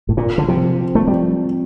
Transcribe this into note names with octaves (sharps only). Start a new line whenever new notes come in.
A2
A#2 F4
D3
C3 F3
C4
A3
F3 G3